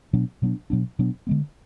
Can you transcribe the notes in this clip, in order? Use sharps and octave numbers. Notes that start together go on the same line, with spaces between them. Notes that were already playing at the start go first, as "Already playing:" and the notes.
B2 F#3 B3 D4
B2 F#3 B3 D4
B2 F#3 B3 D4
B2 F#3 B3 D4
D3 G#3 B3